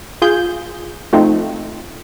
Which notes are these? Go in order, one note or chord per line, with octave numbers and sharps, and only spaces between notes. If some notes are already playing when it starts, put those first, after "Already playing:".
F4 G#4 G6
F3 A3 C4 D#4